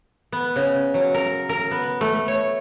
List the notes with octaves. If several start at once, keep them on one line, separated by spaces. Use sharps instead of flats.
B3
C#3
F#3
A#4
A#4
B3
A3
C#5